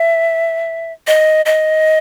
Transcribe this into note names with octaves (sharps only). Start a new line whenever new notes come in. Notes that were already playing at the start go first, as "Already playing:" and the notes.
Already playing: E5
D#5
D#5